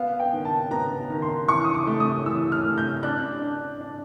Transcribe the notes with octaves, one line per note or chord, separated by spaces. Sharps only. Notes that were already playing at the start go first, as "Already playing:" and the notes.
Already playing: B3 F5
G5
D#3
A5
B3 A#5
D#3
C6
E3 C#6
D#6
D6
A3
D#6
E3 E6
F6
A3
G6
D4 F#6
D4
D4